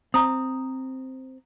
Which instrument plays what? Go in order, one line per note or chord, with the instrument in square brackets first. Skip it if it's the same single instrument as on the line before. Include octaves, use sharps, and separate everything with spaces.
[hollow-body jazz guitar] C4 [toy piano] A#5 D#6